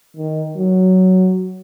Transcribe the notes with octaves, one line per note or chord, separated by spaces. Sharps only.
D#3
F#3